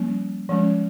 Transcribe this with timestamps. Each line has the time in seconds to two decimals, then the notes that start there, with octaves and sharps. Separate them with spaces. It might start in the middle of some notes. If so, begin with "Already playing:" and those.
Already playing: F3 G3 A#3 C#4
0.49 F3 G#3 C#4